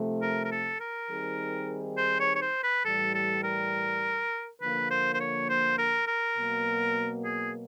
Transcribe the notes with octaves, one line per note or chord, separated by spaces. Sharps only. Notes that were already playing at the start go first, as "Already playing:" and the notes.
Already playing: C3 F3 A3
A#4
A#4
A4
A#4
D#3 G3 C4 D#4 G#4
C5
C#5
C#5
C5
B4
A2 E3 G3 A4
A4
A#4
D3 F3 A#3 B4
C5
C5
C#5
C5
A#4
A#4
B2 F#3 A#3
G#4